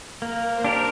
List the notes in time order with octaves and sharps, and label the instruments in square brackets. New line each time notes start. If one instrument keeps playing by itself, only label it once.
[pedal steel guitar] A#3 [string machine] A#4
[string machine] C5
[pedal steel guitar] D4 G4 A#4